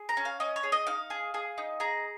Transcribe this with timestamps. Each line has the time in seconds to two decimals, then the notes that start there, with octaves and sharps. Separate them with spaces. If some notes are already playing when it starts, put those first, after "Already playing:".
Already playing: G#4
0.09 A#5
0.17 C#4
0.25 F5
0.40 C#4 D#5
0.56 C#5
0.63 G#4
0.72 D#5
0.87 D#4 F5
1.10 G#4
1.34 G#4
1.58 D#4
1.80 G#4 A#5